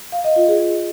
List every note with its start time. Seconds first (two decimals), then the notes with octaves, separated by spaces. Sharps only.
0.12 F5
0.24 D#5
0.36 F4
0.48 G#4